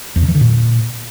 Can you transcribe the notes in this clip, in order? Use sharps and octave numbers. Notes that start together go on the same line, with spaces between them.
E2
C3
E3
D3
A#2